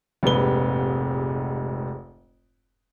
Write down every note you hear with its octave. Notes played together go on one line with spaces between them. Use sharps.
F1 A#1 G#2 C3 B4 G7